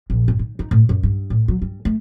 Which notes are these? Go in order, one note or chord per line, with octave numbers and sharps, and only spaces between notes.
A#1
G1
D#3
D#4
A2
F#2
G2
A2
F#3
G2
A3